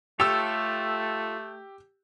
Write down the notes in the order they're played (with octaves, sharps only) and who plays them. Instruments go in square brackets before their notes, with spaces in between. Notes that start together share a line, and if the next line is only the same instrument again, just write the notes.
[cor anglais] A3 [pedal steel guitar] F4 A4 C#5 [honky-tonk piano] G4 E6